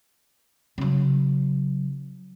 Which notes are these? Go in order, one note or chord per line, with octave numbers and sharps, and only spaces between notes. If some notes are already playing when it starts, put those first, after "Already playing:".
C#3 F#3